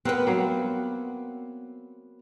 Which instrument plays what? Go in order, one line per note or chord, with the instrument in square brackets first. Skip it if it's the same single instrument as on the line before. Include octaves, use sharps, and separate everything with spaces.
[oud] B3 B4 [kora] C4 A#4 F#5
[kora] F#3 A#3 C4